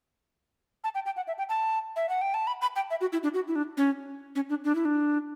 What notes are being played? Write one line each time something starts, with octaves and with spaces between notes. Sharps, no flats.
A5
G5
G5
F#5
E5
G5
A5
E5
F#5
G5
A5
B5
B5
G5
E5
F#4
E4
D4
F#4
E4
D4
C#4
C#4
D4
D4
E4
D4